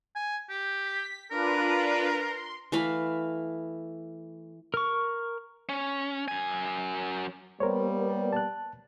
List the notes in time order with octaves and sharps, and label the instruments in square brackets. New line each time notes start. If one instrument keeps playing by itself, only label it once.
[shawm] G#5
G4
[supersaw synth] B6
[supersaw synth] D4 F4 B4 [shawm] A#4
[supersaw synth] C6
[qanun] E3 A3 F5 B5
[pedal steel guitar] A#4 C#6
[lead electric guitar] C#4
F#2 G#5
[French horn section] G3 A#3 B3 [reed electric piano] A#4 C5 C#5
[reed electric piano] A5 F#6